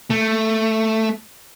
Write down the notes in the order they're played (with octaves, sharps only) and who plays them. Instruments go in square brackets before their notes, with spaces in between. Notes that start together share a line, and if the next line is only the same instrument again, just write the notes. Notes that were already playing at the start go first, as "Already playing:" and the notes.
[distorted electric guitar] A3